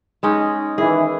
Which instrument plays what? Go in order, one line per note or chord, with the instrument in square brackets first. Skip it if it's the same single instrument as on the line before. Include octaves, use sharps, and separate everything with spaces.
[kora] G#3 C#4 D#4
[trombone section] D#3 E3 [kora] G#4